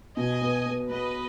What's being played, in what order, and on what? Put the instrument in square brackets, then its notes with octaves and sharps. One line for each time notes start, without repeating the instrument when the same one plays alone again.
[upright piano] B2 [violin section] D#5 G#5
[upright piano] B3
B3
[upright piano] B3 [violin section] B4 D#5